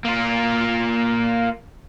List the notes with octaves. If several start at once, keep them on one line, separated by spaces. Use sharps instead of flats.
A#3 F4